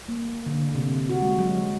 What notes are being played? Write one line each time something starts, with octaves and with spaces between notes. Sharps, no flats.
A#3
D3
C3
F#4
G#3
F#3